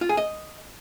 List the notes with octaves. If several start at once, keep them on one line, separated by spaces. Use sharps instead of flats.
F4
G#4
D#5